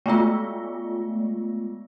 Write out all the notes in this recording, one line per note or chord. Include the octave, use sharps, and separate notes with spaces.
G#3 A3 B3 F4